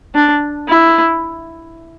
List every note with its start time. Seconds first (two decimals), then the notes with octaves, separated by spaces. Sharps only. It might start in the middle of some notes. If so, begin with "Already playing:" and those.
0.15 D4
0.69 E4